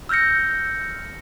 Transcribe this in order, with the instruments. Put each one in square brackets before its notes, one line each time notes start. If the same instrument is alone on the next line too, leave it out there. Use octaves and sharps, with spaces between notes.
[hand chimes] E6 F6 G6 A#6 C#7